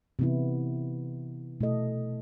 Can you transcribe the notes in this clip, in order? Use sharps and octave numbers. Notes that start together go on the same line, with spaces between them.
C3 E3 B3 E4
B2 A3 E4 A4 D#5